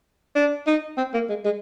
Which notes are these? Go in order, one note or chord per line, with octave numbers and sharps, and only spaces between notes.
D4
D#4
C4
A#3
G#3
G#3